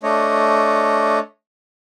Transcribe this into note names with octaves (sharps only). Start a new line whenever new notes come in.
A3 D4 C#5 D#5